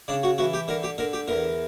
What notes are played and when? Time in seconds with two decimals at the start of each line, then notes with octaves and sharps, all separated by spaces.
0.08 C#3 D4
0.23 F#4
0.38 E3 F#4
0.53 G4
0.68 D3 A#4
0.83 G4
0.98 D3 A#4
1.13 G4
1.28 E2 A#4